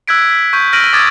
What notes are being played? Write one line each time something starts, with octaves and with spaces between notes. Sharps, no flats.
E6 F#6 G#6 B6 D7
B6
C#6 G6
F6 A#6 D7 D#7 F#7
D6 D#6 G#6 A6